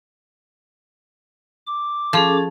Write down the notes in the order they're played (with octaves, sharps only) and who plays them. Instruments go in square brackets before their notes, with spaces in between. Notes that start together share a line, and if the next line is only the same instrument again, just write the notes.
[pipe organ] D6
[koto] F3 [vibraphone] C#4 G#4 A4